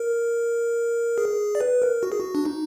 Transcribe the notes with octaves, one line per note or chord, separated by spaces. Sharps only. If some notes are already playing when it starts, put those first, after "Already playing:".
Already playing: A#4
G#4
D5
B4
A#4
F#4
G#4
F#4
D4
D#4